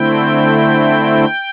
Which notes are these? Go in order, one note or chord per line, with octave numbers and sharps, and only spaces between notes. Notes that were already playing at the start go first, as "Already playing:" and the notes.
Already playing: D3 A3 C4 E4 G5